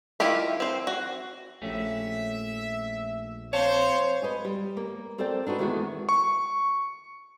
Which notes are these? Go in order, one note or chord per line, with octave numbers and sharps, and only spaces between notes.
D#3 E4 F4 G4 B5
C4 C5
F#4
A#1 A3 C#4 G4 E5
C4 C5 C#5 F5 A5
B4 D#5 G#5
G3
A#3
C4 A4 A#4 C5 D5 G5
D4 D#4 F#4 B4
E2 D#3 G#3 A3 F#4
C#6